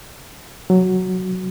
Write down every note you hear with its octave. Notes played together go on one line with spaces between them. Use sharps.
F#3